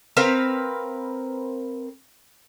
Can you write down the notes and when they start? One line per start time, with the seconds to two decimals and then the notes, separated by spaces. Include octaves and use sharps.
0.17 C4 A#4 B4 F5